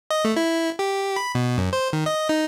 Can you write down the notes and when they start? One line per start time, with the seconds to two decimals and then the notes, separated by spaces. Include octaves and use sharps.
0.11 D#5
0.25 A3
0.37 E4
0.79 G4
1.16 B5
1.35 B2
1.58 F#2
1.73 C5
1.93 D#3
2.06 D#5
2.29 D#4